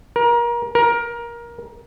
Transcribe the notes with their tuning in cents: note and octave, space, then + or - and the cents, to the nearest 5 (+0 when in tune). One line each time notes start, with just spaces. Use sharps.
A#4 +30
A#4 +20